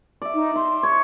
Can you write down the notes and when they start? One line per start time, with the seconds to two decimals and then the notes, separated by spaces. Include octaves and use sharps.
0.22 D5 E5
0.34 D#4
0.56 E5 C6
0.83 C#5